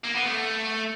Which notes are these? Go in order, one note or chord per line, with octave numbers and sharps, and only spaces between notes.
A#3
B3
A3